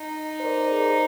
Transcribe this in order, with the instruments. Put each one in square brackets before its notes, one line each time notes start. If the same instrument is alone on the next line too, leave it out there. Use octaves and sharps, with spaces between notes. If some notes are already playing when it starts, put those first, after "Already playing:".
Already playing: [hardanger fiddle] D#4
[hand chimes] C5
A#4 D5
G#4 C5